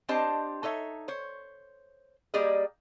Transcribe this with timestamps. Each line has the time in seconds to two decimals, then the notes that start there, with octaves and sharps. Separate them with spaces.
0.09 C4 D4 G4 C5 D#5 A5
0.63 D#4 A4 C#5 E5
1.08 C5 C#5
2.34 G3 A#3 G4 G#4 D5 D#5